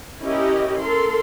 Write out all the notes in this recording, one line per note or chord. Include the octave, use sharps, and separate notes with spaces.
C#4 E4 G4 A#4 D#5
A4 A#4 C6